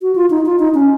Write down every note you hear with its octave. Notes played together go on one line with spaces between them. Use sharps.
F#4
F4
D#4
F4
D#4
C#4